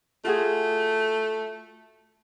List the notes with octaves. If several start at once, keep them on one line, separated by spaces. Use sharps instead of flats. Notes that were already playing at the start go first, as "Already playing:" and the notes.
A3 F4 F#4 G#4